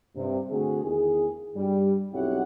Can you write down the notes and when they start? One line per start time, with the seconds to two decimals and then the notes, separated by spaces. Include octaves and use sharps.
0.16 G2 C3
0.50 D3 A3 C4 F#4 G#4
0.84 E2 D#3 G#4
1.55 G2 G3
2.13 B1 C4 E4 G4 C#5 F#5